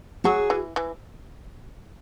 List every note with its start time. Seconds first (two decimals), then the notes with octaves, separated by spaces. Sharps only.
0.24 F#3 F#4 G#4
0.50 E3
0.76 E3